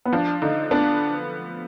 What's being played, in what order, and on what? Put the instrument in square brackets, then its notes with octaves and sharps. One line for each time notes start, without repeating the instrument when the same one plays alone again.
[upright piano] B3
[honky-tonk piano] F3 [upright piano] D4
[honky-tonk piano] D3 [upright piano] D#4
[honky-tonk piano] B3 [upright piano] D4